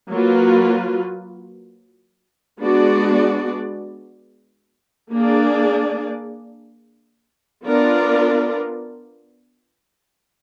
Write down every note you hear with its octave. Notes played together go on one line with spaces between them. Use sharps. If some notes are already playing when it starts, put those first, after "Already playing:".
F#3 A#3 F4 B4
G#3 B3 D4 F#4 D5
A#3 D4 G#4 D5
B3 D4 F4 A#4 D5